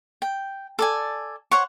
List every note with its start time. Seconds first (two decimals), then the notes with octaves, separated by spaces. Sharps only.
0.22 G5
0.79 A4 D5 G#5
1.51 C5 C#5 F#5 C#6